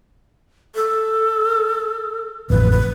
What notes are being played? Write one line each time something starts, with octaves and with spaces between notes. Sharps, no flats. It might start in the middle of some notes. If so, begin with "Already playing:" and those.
A4
A1 F2 B4
B4